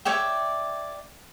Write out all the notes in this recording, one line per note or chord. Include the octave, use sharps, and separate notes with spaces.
C#5 D5 E5 G5